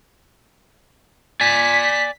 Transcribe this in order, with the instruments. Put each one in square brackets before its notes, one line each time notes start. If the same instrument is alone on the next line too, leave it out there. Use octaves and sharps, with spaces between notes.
[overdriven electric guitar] D5 G#5 [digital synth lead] B6